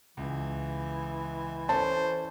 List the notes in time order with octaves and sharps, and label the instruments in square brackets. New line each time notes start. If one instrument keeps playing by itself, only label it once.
[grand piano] C#2 [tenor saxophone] E3
[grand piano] C#4 A4 D5 [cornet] C5 [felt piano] A5